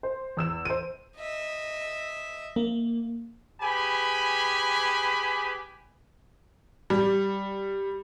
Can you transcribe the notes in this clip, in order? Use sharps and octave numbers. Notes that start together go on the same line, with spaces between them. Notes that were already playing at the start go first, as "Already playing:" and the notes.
C5
E2 E6 E7
C5 D#7
D#5 E5
A#3
G4 G#4 B4 G#5 B5
G3